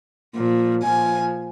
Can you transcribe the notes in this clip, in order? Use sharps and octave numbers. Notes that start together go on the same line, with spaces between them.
A#2 F3
A#2 F3 G#5